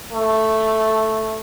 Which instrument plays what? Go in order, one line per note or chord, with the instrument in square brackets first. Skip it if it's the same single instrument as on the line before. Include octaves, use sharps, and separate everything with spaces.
[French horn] A3